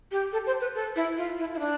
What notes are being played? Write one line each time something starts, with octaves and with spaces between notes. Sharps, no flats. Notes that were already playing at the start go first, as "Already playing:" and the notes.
G4
A4
C5
B4
A4
E4
F4
E4
E4
D4